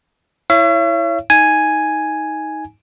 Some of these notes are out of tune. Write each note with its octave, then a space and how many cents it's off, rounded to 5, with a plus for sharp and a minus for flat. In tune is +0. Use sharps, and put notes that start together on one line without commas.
E4 +0 C#5 +0 E5 +45
D#4 +20 G#5 +0